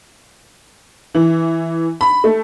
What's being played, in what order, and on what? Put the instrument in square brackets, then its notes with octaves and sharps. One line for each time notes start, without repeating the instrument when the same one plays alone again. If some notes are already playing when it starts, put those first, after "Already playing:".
[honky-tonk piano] E3
B5
A3